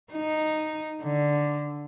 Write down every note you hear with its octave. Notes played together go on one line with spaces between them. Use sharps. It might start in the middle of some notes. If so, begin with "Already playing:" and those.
D#4
D3